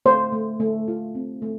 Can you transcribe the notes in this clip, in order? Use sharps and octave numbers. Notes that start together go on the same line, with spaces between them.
A3 C5
A3
A3
F4
C4
A3